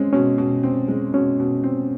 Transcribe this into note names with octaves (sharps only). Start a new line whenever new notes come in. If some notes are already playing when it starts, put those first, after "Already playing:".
Already playing: G#3 C4 C#4
B2 C#4
B2
C4
G#3
B2 C#4
B2
C4